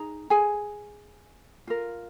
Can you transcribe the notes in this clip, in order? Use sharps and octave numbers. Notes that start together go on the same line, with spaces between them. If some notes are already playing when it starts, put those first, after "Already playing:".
Already playing: D#4 G#4 A#5
G#4 G#5
F4 A#4